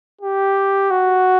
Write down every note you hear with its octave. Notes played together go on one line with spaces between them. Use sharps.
G4
F#4